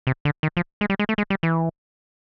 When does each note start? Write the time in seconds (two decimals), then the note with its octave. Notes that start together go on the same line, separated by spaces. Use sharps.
0.07 C3
0.25 D3
0.43 D#3
0.57 F3
0.81 G#3
0.90 G3
0.99 G#3
1.09 A3
1.18 G#3
1.30 G3
1.43 E3